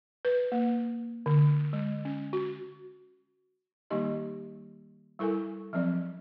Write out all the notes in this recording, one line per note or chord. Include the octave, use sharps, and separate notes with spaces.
B4
A#3
D3
G#3
C#4
F#4
D#3 G3 A#3 D#4 G4 D#5
G3 E4 A4 A#4 G#5
F3 F#3 C4 D5